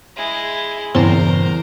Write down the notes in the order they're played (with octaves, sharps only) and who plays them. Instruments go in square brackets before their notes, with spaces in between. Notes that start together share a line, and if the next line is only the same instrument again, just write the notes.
[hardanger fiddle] G#3 E4
[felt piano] E2 [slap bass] G2 A#2 C#3 [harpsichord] C4 A5 [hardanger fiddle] A#4 C5